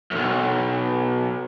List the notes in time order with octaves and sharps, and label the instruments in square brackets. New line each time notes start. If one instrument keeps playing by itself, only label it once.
[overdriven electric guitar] B1 F#2